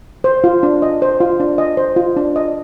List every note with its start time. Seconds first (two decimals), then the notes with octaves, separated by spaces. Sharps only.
0.24 C5
0.44 F4
0.63 D4
0.82 D#5
1.02 C5
1.20 F4
1.40 D4
1.58 D#5
1.77 C5
1.96 F4
2.16 D4
2.36 D#5